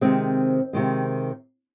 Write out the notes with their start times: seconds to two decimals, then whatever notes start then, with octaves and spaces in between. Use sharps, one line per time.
0.01 C3 D#3 G#3 C4
0.73 C3 D#3 G#3